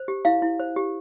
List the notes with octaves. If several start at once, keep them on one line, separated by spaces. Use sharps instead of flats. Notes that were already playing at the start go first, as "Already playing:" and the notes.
Already playing: C5
G4
E4 F5
E4
C5
G4